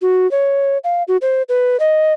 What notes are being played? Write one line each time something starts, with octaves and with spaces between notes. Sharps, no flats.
F#4
C#5
F5
F#4
C5
B4
D#5